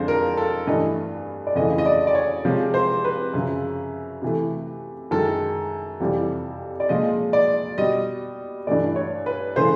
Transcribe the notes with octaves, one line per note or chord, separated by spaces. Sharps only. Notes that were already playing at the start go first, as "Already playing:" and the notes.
Already playing: F2 D3 F3 G#3 C5
A#4
A4
G2 E3 A3 D#5
D5
F2 C#3 E3 A3 D#5
D#5
D5
D5
C#5
C3 F3 G#3
C5
B4
F#2 C#3 F3
C3 E3 A3
F#2 D#3 G#3 A4
F2 C3 E3 G3
D5
A#2 F3 G#3 D#5
D5
B2 G3 D#5
G2 E3 A3 D5
C#5
B4
C#3 E3 A3 C5